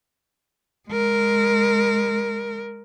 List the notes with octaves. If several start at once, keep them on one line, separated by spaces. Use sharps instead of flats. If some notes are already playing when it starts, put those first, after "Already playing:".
G#3 A#4